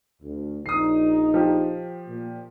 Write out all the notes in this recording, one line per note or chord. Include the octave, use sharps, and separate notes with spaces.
D2
A#1 D#4 D#6 C7
F3 G4
A#2